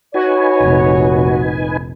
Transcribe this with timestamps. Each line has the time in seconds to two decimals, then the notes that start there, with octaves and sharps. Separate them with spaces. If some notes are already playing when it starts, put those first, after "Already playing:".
0.14 D#4 F#4 B4 C#5 G#5
0.61 F1 A#1